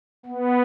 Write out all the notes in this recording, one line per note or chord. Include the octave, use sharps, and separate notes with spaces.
B3